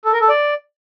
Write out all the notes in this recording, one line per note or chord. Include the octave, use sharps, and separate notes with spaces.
A4
A#4
A4
D5